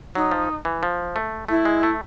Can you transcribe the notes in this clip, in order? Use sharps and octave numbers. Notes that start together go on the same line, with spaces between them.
F#3 D#4
F3
E3
F3
A3
A3 E4
G#3
A3